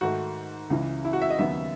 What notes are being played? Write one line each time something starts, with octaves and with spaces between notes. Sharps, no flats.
G#2 D#3 A3 F#4
C#2 C#3 E3
E4
F#4
E5
D#5
D#2 C#3 F#3 B3 E5